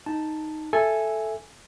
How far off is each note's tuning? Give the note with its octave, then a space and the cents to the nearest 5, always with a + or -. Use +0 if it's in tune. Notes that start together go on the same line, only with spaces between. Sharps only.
D#4 +0 A5 +0
A4 -5 E5 +5 G#5 +0